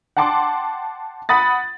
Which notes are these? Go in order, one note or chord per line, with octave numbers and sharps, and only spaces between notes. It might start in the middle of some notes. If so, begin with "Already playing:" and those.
F#5 G5 A5 C6 D6
F#5 B5 D#6 A6